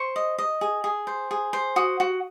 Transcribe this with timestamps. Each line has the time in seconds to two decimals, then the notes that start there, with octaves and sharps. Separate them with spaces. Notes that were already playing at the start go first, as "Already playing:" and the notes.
Already playing: C5 C#6
0.16 D#5
0.39 D#5
0.61 G#4
0.84 G#4
1.07 C5
1.31 G#4
1.53 C5
1.76 F#4 D#6
2.00 F#4